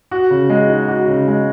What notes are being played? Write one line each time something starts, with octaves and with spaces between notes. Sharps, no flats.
F#4
C#3
G#3
D#4
F#4
C#3
G#3